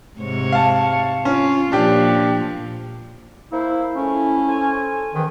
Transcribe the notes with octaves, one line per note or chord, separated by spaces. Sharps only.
G#2 C3 C#5
F5 A5
C#4 F4
A#2 F3 D4 G4
A#3 E4 C5
F3 A3 C#4 E4
A4 C5 G#5
G#2 D#3 E3